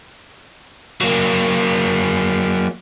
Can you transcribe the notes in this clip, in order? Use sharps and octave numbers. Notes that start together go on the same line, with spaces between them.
F#3 A#3